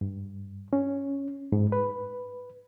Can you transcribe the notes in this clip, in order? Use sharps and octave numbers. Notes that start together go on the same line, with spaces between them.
G2
C#4
G#2
B4